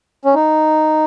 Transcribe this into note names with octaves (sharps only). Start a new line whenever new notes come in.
C#4
D#4